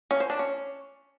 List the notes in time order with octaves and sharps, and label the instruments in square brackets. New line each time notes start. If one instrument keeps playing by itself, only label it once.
[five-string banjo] C#4
C5
D4
C#4